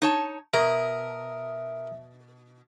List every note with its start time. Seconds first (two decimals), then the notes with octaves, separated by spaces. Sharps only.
0.02 D#4 C#5 A5
0.54 B2 A#4 E5 D#6